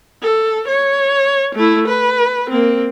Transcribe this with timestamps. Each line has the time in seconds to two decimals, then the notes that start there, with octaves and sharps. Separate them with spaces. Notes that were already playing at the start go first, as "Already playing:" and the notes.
0.23 A4
0.68 C#5
1.55 A3 E4
1.88 B4
2.50 A#3 C4